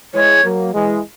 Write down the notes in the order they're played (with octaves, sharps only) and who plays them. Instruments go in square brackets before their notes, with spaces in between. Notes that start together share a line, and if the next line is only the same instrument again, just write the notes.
[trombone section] E3 G#3 [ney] C#5
[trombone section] F#3 A#3
E3 G#3